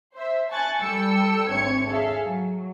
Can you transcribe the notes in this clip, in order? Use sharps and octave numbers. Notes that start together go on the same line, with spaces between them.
C5 E5
G#5 A5 C#6 F#6 G#6 A6
G3 A4 G5 A5 E6 C#7
G#1 D2 C4 C#5 G#6 C#7
G#4 A4 E5 F5
F#3